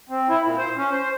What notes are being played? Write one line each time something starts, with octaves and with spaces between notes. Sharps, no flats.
C4
E4
A#2
C5
C#4
C5